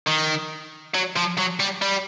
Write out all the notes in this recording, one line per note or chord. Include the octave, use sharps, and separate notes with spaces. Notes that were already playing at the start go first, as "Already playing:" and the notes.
D#3
F#3
F3
F#3
G3
G3